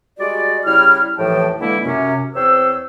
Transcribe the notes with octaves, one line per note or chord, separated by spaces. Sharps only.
G3 G#3 F#4 D5
C#3 G3 E4 F6
D#2 A2 E3 F3 G5 A5
D3 E3 G#3 A#3 E4
F#2 C3 C#4
E2 C4 C5 C#5 E6